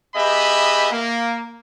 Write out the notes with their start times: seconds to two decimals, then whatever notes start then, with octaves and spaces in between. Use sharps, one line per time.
0.15 B3 G4 G#4 D#5 E5 B5
0.91 A#3